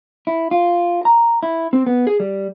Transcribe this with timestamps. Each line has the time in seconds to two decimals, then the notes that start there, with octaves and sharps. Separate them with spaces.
0.27 E4
0.51 F4
1.05 A#5
1.43 E4
1.73 C4
1.87 B3
2.07 G#4
2.20 G3